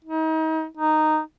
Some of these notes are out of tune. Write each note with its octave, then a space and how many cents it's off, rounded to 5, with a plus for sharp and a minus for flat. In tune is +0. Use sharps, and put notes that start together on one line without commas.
D#4 +35
D#4 -5